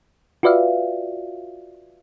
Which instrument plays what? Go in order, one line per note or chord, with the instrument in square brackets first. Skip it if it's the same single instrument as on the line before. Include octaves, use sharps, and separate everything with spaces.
[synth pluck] F4 F#4 B4 D5 E5 F5